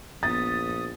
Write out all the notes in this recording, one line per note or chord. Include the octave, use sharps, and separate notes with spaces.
A#1 B3 D#6 A6